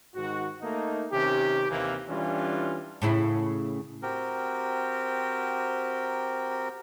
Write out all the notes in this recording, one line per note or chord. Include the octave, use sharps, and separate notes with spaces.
G#2 D#3 F#4
A3 A#3 D#4
C3 D#3 C#4 G4
D#2 C3 E3 A#3
E3 G3 C#4 D4 F4
A2 C#3 E4
C4 F#4 G4 A#4